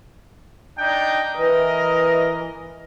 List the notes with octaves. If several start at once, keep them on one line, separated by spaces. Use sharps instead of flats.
D4 D#4 G5
E3 A#4 D#5